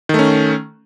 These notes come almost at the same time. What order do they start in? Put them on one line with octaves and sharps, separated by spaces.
D#3 A3 C#4